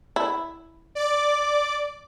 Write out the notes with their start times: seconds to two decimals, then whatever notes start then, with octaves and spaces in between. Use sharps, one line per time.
0.16 E4
0.95 D5 D6